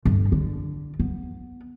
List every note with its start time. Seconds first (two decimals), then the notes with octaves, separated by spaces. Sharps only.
0.05 G1
0.32 D3
1.00 B3